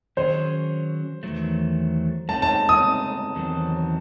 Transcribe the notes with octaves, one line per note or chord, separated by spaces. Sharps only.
D#3 F#3 C#4 G#4 C5
E2 D#3 F#3 A3
G#3 C4 D#4 A5
A5
D#6
E2 D#3 F#3 C4